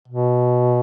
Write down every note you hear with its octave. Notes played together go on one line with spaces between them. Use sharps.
B2